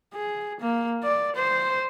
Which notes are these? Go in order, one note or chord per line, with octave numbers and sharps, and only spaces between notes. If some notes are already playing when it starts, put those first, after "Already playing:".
G#4
A#3
D5
C5